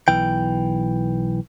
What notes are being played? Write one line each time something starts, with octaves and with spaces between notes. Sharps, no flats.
B1 E3 G5